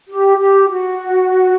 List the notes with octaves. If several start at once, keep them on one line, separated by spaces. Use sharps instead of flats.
G4
G4
F#4